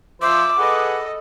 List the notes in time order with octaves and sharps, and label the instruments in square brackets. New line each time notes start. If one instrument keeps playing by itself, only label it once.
[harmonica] F3 C5 [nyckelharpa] E5 [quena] D6
[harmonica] G#4 B4 F#5 [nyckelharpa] A4 D#5